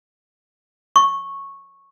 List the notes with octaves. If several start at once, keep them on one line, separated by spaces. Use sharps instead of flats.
C#6